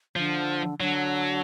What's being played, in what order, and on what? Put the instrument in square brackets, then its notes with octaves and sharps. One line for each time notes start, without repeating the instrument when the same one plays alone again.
[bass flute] D3 [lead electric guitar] F3
[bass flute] D3 [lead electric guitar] F#3